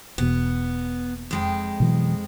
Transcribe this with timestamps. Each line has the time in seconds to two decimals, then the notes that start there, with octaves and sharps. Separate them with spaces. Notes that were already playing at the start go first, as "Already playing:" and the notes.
0.18 E1 E2 B2 B3
1.31 F2 G#3 G5
1.80 B2 E3 F#3